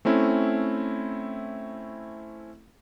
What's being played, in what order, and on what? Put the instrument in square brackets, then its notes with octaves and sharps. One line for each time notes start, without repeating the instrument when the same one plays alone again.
[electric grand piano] A3 C4 C#4 E4